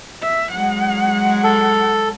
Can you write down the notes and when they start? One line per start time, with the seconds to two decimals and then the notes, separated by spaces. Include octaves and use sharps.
0.22 E5
0.51 F#3 G#3 F#5
1.44 A4